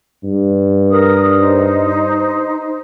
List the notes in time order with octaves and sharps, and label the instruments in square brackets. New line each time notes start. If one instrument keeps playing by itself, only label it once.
[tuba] G2
[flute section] A#4 D#6
D#4 C5